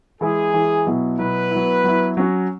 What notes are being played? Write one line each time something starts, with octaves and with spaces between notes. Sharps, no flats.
E3 G#3 E4 G#4
E3 G#3 E4
B2 F#3 B3 E4
B2 F#3 B3 E4 B4
F#3 B3 E4
F#3 B3 E4
F#3 C#4 F#4